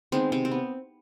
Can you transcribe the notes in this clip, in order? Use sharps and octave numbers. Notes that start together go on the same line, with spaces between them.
D#3 G#3 B3 C4
C3 C4
C4
B3